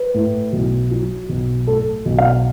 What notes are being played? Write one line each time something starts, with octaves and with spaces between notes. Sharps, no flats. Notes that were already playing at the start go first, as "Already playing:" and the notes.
Already playing: B4
A2
B1
F#3
B1
A2 A4
B1
F5